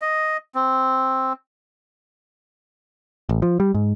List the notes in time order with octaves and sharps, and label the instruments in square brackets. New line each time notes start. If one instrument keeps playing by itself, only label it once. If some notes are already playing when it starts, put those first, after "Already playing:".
[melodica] D#5
C4
[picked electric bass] A1
F3
G3
G#2